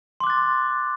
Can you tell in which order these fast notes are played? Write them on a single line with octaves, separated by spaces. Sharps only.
C6 D6 F#6 A6